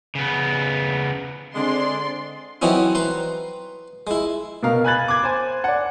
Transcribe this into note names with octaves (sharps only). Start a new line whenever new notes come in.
C#3 B3
D3 G#3 C4 D4 D5 C6
E3 F#3 C4 C#4 D#4 E4
B4 A#5 C6
G#3 E4
B2 A#4 F5
G#5 B5 F#6 G#6 A6 F#7
D6 G#6
C5 G#5
D5 F#5